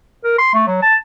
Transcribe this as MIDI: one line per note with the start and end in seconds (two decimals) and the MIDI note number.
0.24 0.37 70
0.38 0.50 84
0.54 0.67 57
0.67 0.81 54
0.82 0.95 81